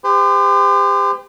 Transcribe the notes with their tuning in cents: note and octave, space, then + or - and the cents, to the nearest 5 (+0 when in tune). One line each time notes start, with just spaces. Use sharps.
G4 +35 C5 -35